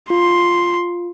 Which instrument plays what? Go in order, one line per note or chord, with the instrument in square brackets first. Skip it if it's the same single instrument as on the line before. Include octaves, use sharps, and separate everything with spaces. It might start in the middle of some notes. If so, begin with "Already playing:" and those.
[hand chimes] F4 [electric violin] C6